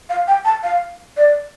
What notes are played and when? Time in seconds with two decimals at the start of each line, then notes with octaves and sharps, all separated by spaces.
0.09 F5
0.27 G5
0.45 A5
0.63 F5
1.17 D5